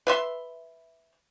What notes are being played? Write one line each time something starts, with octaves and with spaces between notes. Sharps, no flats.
B4 E5 C6